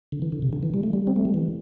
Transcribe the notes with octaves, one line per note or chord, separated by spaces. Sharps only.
D3
E3
D3
C3
D3
E3
G3
A3
G3
C4
A3
G3
E3